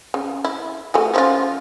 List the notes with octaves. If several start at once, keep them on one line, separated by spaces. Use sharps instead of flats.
C#3
E4
A3 F#4 G#4
F3 C#4 F4